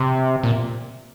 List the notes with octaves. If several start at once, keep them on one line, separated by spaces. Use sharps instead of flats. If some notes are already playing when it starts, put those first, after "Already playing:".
Already playing: C3
A#2